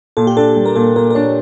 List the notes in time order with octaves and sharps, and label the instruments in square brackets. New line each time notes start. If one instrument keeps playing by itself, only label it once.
[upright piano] A#2 [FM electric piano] A4
[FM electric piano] G4
[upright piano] D4 [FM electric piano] A4
[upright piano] G3
[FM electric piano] A#4
[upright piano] A#2 [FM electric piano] A4
[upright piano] A#2 [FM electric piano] A#4
[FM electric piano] A#4
[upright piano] D4 [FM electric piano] C#5